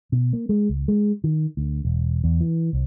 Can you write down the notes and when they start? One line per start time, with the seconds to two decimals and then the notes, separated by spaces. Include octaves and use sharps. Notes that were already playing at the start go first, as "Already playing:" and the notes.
0.12 B2
0.33 A#3
0.49 G#3
0.69 C#2
0.88 G#3
1.24 D#3
1.57 D2
1.85 E1
2.24 E2
2.41 E3
2.73 C2